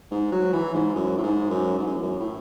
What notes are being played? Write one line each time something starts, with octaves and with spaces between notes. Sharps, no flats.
G#2
F#3
E3
G#2
F#2
A2
G#2
F#2
G#2
F#2
E2
F#2
A2